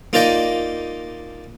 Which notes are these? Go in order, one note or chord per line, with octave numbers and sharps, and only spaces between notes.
A#3 D#4 F4 D5 D#5 G5